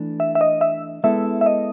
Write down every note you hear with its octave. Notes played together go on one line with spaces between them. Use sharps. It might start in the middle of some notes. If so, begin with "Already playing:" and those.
Already playing: E3 A3 D4
E5
E5
D#5
E5
G#3 B3 E4 A4 E5
E5
D#5